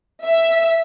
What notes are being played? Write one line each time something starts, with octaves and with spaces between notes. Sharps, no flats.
E5